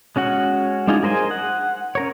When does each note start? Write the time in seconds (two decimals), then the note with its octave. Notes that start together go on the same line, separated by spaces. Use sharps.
0.16 G#3 C#4 F#4 F#5
0.87 G#3 D4 D#4 F4 G#4
1.03 G#4 A#4 C5 D#5 G#5
1.31 F#5
1.95 C#4 A#4 C#5